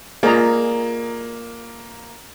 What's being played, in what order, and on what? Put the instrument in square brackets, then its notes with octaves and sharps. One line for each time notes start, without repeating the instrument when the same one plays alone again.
[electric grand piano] A#3 [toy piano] F4 D5 D#5 [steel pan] G#4 A#5